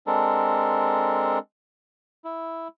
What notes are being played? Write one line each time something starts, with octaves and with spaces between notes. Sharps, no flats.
G#3 C4 D4 A4 A#4
E4